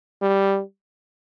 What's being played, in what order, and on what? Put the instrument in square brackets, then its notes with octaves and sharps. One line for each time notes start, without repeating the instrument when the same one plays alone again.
[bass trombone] G3